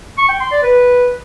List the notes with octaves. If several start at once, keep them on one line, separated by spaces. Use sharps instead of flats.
C#6
G5
C6
D5
B4